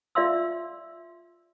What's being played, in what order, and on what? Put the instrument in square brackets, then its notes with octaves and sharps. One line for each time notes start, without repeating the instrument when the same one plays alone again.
[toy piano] F4 D5 E5 F5 C6 E6